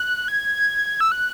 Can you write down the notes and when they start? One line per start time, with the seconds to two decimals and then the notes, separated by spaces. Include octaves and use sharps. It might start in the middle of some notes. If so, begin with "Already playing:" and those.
Already playing: F#6
0.28 G#6
1.00 E6
1.12 F#6